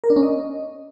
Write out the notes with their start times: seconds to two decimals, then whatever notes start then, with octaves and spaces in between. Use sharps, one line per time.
0.04 A#4
0.10 D4
0.16 C#4
0.23 D#5